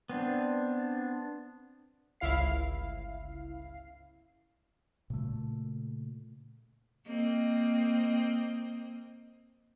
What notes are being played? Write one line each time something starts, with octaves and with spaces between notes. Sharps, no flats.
B3 C4 D4
G1 C#2 E4 F5 C7
A#2 C#3 A3
A#3 C4 D#5